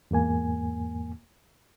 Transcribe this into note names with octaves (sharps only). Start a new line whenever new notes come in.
E2 G#2 A#3 G#5